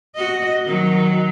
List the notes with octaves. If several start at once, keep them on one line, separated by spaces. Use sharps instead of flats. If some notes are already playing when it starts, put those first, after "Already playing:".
F#4 D#5
D#3 F#3